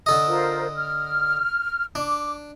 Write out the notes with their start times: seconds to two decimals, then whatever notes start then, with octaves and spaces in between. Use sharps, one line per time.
0.06 D3 A4 D#5
0.27 F4 A#4 C5
0.75 F6
1.95 D4 D6